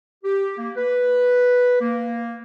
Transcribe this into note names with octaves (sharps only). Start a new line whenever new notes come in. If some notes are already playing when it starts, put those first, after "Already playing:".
G4
A#3
B4
A#3